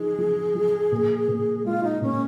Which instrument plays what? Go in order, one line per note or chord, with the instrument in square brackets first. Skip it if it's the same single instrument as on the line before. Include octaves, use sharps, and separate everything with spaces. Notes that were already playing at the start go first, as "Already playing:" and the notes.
Already playing: [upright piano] F3 D#4 [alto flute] G#4
[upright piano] F3
F3
A#2
A#2
[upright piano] G#3 [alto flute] F4
[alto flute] D#4
[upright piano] A#2 [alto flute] C#4